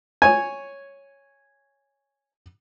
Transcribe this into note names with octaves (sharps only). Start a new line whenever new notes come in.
C#5 G#5